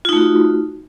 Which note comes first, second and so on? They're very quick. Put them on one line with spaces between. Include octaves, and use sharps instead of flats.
F4 D#4 A3 F#4